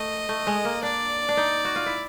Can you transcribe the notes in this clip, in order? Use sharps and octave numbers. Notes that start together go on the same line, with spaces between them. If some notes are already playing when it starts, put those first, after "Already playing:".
Already playing: A3 D#5
A3
G#3
A#3
D4 D5
D4
D#4
F#4
F4
E4